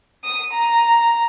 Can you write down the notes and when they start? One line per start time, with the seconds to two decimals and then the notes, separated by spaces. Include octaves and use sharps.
0.24 D#6
0.54 A#5